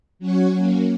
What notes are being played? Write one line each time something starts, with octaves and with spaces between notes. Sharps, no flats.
F#3 C#4 F#4 C#5
F#3 A#3 C#4